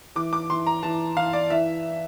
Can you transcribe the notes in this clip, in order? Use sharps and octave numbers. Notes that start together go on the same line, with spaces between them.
E3 D6
D6
E3 C6
A#5
E3 A5
E3 F5
D5
E3 E5